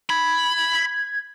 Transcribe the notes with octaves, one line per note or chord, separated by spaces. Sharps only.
B5 G#6